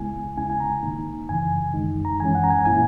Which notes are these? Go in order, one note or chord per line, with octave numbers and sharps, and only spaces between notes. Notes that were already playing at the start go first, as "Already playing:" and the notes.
Already playing: C#2 C#3 G#3 B3 E4 G#5
D#2 C#3 G#3 C#4 E4 G#5
G#5
A#5
G#2 D#3 A#3 D#4
F#2 C#3 E3 G#5
F#2 D#3 G#3 D#4
A#5
F#2 E3 G#3 C#4 G#5
F#5
A#5
G#5
A#2 A#3 C#4 E4 G#5